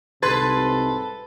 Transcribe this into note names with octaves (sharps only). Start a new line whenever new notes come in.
C2 G#2 C3 A4 B4 C6 G#6 A6